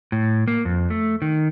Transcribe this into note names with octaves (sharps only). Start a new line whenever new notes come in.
A2
A#3
F2
A3
D#3